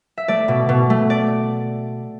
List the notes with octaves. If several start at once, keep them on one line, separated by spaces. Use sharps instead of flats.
E5
A3 D5
B2
B2
A3
D5